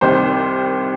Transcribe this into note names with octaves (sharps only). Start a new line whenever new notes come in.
C2 C3 D#3 C5